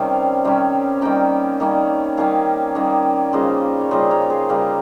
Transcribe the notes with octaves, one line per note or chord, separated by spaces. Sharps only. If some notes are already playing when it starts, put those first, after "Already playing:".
Already playing: C3 D#3 G3 C#4 F5
C3 D#3 G3 C#4
D#3 G3 A#3 C#4 G5 A#5
D#3 G3 A#3 C#4
D#3 G3 A#3 C#4 F5 G#5
D#3 G3 A#3 C#4
C#3 G3 A#3 F4 C5 D#5
C#5
C#3 G3 A#3 F4 C5 D#5
A#4 C#5
C#5
G#4 C5
C#3 G3 A#3 F4